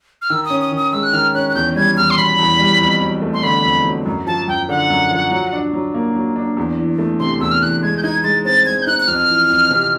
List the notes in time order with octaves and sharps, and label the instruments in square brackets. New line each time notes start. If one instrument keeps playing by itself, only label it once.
[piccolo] F6
[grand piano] D#3 [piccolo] E6
[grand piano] C#4 [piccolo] D#6
[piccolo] D#6
[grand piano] D#3
[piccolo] D#6
[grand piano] G#3 [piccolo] E6
[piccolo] F#6
[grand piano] D#3 [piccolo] F6
[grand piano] C#4 [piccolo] F#6
[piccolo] F#6
[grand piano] E2 [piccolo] G6
[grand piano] G3 [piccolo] G#6
[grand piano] E2 [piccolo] F6
[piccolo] C6
[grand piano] B2 [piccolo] B5
[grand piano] E2
G3
F2
F#3
A3
[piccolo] C6
[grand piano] D3 [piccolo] B5
[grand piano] F2
F#3
F#2
[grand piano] F3 [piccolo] A5
[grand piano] F#2 [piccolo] G5
[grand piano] D3 [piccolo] F#5
[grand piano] F#2
F3
F#3
D4
F#3
A#3
F#3
D4
E2
E3
A3
[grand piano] C3 [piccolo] C6
[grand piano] E2 [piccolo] E6
[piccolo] F6
[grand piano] E3 [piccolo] F#6
[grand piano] G#3 [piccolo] G#6
[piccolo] G6
[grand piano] D#4 [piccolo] G#6
[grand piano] G#3 [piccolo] A6
[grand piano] C4 [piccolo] A6
[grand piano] G#3 [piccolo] G#6
[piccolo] G6
[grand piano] D#4 [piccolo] F#6
[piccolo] F#6
[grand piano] F2 [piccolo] F6
[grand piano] E3
F2
C3